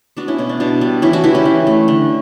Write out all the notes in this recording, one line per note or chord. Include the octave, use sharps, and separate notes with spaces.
B3 D4 F#4
C#4 E4
B2 C#4
D4
B2 D4
G3 D4
E3 C#4 E4
D4 F#4
E3 E4 G4
C#4 E4
E3
A3
D3